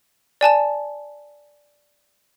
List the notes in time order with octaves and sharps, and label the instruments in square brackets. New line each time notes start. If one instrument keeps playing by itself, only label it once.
[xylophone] D5 G#5 A5 E7